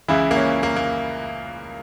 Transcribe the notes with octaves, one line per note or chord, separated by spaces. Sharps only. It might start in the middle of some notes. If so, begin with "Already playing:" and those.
C#2 C#3 E3 E4
A#3
C#4
A#3
A#3